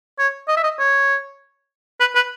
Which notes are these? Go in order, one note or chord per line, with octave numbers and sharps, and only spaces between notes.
C#5
D#5
E5
D#5
C#5
B4
B4